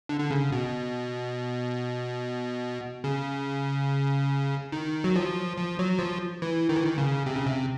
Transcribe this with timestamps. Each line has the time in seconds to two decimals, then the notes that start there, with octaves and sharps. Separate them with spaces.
0.09 D3
0.20 D3
0.31 C#3
0.52 B2
3.04 C#3
4.72 D#3
5.04 F#3
5.16 F3
5.57 F3
5.79 F#3
5.99 F3
6.42 E3
6.69 D#3
6.76 E3
6.84 D#3
6.98 C#3
7.26 C3
7.36 C#3
7.46 C3